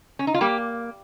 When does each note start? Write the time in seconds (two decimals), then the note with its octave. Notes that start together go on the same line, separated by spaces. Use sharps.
0.19 C#4
0.27 D#4
0.34 F4
0.41 G3 A#3 G4